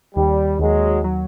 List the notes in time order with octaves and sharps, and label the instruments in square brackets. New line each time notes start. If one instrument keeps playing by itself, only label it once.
[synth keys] D#2 [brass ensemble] G3
[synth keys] D#2 [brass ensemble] F#3 G#3
[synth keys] F#3